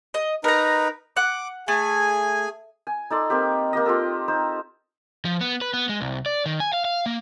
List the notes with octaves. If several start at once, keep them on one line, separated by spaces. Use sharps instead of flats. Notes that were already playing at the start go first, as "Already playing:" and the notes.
D#5
D#4 A#4 B4 A#5
F#5 D6 F#6
A3 G#4 G#5
G#5
D#4 A4 D5 C6
A#3 C4 G4
A#3 G4 D#5
F4 G4 A4
D#4 C5
F3
B3
B4
B3
G#3
C2
D5
D#3
G#5
F5
F5
A#3